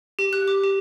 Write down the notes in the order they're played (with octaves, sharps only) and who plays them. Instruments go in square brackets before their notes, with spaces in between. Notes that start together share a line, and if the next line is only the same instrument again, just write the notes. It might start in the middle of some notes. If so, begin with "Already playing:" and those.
[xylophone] G4
F#6
D6
G4